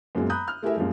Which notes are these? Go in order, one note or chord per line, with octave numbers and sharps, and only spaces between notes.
F#2 A#2 F#3 G#3 B3
A#5 B5 D#6 F#6 G6
F6
A3 E4 G4 G#4 A#4 E5
F#2 A#2 F3 G3 G#3